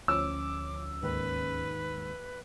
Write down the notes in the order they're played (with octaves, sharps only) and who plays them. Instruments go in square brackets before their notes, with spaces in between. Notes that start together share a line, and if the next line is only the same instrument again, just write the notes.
[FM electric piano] D2 F3 C#4 [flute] D6 [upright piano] E6
[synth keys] D#2 G#2 [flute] B4